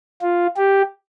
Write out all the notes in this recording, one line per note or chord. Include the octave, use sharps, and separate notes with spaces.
F4
G4